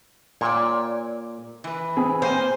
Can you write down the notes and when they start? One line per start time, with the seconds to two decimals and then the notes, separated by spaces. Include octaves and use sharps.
0.41 A#2 C#5 D5 G5
1.64 E3 B4
1.97 C4 G#4
2.22 A#3 C5 F5 G#5